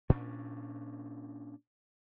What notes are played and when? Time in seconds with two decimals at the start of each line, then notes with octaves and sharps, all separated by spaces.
0.09 A#2 C#4 D4